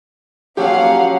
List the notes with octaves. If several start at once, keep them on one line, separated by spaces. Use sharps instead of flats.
F3 F#3 A#3 C#4 G4 F5 F#5